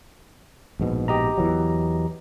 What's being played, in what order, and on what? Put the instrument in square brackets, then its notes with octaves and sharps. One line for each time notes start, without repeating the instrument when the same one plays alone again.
[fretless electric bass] A#1 G#2 B2
[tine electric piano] G4 D#5 A#5
[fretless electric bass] E2 E3 F#3